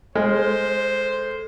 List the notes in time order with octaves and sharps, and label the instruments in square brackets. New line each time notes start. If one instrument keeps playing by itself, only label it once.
[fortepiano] G#3 [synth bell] A4 [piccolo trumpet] C5